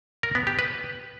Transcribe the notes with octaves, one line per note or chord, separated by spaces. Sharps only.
A#4
B3
G4
B4